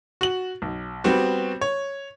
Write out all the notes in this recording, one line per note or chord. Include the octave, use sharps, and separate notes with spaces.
F#4 F#7
B1
G3 B3 C4 F#4
C#5